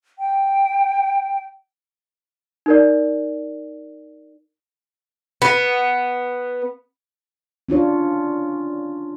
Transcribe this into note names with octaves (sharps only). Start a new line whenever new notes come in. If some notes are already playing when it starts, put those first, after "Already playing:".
G5
D#4 A#4 D5
B3
C#4 D4 F4 C#5